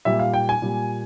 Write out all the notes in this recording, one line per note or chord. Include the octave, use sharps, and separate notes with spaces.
A#2 G3 E5
F5
G5
G#5
A#2 G3